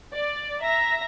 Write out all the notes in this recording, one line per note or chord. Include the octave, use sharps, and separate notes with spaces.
D5
E5 A#5 A#6